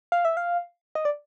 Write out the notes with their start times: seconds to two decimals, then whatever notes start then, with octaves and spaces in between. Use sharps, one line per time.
0.12 F5
0.25 E5
0.37 F5
0.95 D#5
1.05 D5